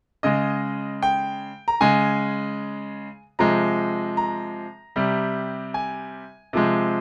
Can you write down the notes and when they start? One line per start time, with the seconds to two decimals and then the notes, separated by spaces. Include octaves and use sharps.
0.23 C#3 G#3 D#5
1.03 G5
1.68 A#5
1.81 C#3 G#3 G#5
3.39 C3 F3 G#3 A#5
4.17 A#5
4.96 C3 G3
5.74 G#5
6.53 C3 F3 G#3